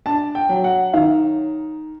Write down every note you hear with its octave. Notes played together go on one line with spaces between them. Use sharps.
D4 A5
G5
F#3
F#5
D#3 F5